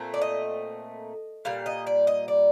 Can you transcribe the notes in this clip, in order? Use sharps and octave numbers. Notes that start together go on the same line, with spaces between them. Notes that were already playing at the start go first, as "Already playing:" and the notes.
Already playing: A#2 A3 C4
D5
D#5
A#2 G3 F5
D#5
D5
D#5
D5